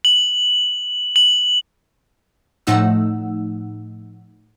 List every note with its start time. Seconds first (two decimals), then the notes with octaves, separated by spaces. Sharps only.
0.05 F#7
1.16 F#7
2.67 A2 F3 A3 D#4 F#5 E6